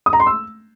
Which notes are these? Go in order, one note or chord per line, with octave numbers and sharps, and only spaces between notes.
D#6
A#5
C6
E6